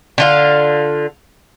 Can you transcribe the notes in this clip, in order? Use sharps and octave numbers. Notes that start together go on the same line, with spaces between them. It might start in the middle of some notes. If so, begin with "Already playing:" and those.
D3 F4 F5